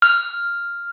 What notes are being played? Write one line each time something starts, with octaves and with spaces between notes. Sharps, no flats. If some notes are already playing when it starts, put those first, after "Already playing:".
F6